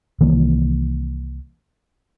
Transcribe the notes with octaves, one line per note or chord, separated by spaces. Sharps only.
C2 D#3 E3 A#3